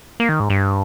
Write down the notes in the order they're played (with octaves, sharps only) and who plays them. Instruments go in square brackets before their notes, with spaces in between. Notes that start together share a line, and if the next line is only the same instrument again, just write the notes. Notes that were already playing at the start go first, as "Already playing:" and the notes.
[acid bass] A#3
D#3
G#2
G2